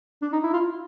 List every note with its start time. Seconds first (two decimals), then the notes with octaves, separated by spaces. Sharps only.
0.22 D4
0.33 D#4
0.43 E4
0.53 F4